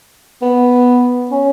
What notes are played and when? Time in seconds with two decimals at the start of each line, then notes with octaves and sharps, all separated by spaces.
0.42 B3
1.31 C#4